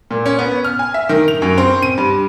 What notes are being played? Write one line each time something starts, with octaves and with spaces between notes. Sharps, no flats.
A#2
C#4
B3
F6
G#5
E5
D#3
F7
F#2
C4
D#7
G2